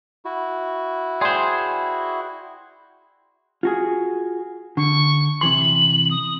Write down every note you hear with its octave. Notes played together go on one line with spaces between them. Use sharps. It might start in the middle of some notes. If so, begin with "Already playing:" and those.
E4 F#4
G#4 C5 D5 G5 C6
F4 F#4 G#4
D3 C#6
C3 E3 C6 F#7
D#6